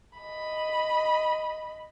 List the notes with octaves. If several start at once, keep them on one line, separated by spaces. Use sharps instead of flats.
D#5 B5